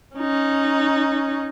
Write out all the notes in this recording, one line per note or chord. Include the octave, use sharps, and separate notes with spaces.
C#4 D#4